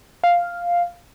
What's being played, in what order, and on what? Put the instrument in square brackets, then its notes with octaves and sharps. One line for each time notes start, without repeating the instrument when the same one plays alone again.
[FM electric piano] F5